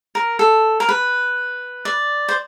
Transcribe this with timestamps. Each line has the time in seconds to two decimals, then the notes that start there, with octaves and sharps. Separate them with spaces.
0.15 A#4
0.39 A4
0.80 A#4
0.89 B4
1.85 D5
2.29 C5